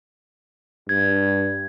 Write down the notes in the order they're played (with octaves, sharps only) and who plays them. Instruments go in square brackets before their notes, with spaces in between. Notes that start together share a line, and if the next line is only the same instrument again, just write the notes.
[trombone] G2 [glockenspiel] G#6